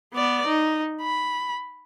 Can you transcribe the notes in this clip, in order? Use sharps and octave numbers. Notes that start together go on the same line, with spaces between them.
B3 D5
D#4
B5